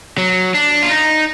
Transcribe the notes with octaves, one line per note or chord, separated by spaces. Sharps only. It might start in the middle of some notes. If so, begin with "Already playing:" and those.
F#3
D4
F4
D#4